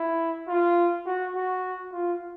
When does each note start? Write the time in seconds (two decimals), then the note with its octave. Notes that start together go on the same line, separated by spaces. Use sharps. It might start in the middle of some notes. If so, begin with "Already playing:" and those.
Already playing: E4
0.48 F4
1.06 F#4
1.35 F#4
1.92 F4